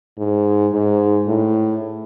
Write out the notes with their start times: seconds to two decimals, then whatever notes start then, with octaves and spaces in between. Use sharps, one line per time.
0.18 G#2
0.73 G#2
1.28 A2